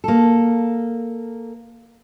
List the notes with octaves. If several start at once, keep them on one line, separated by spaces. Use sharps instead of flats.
A#3 A4